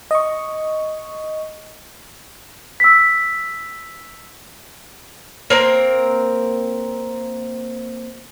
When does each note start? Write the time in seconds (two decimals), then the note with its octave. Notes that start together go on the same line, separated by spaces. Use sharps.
0.11 D#5 C#6
2.80 E6 B6
5.50 A#3 C4 A#4